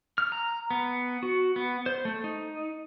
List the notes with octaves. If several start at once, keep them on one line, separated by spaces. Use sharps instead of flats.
F6
A#5
B3
F#4
B3
C5
A3
D#4